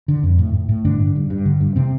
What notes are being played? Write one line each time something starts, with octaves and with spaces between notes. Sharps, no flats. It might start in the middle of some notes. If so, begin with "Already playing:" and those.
D3
F2
A2
A2
A2
G2 D3 D4
D3
G2
G2
D3
G2
C3 C4